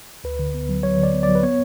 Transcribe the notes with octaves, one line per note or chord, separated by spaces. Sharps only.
D2 B4
D3
B3
F#3
F#3 C#5
D3
D5
B3
F#3 D5
B4
B3 C#5